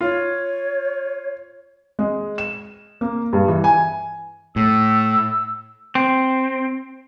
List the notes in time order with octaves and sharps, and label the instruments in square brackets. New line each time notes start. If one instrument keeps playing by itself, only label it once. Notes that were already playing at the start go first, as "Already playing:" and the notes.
[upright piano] F4 [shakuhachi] C#5
[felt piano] G#3
E7
A#3
G2
E3
G#5
[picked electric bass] A2 [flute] E6
[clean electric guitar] C4